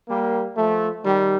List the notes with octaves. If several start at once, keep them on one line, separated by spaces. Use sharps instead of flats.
G3 A#3
F3 A3
D#3 G3